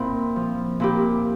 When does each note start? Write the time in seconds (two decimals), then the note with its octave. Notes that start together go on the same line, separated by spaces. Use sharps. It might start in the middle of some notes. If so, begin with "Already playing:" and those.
Already playing: A#2 C4 E4
0.36 F3
0.80 A#2 E4 G4